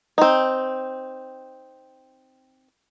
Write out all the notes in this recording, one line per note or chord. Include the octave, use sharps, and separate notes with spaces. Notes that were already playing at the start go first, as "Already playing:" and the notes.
C4 D#4